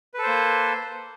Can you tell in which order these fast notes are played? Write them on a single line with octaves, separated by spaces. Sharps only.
B4 A4 C5 A#3